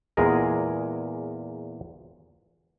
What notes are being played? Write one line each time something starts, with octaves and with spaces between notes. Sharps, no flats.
E2 A#2 G#3 G#4 A#4 D#5